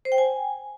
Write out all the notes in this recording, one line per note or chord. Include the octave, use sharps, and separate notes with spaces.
C5
G5
G#5